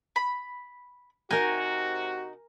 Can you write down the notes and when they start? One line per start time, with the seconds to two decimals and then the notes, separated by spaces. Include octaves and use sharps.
0.16 B5
1.31 C3 D#4 F#4 A#4 G#5